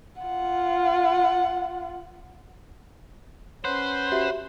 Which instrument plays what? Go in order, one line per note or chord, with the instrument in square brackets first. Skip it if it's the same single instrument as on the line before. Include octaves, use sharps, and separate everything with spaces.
[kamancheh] F4 F#5
[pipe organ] C#4 [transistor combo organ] B4 F#5 C6 [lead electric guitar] C5
[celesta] F#4 G4 E5